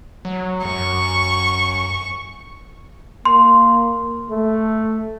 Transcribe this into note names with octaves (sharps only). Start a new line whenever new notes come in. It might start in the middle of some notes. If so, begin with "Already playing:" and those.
F#3
F#2 C#6
A#3 C6
A3